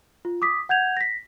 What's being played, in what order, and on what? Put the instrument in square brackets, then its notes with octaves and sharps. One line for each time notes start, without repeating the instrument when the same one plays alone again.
[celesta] F4
D6 D#6 B6
F#5 G6 G#6 F7
A#6 B6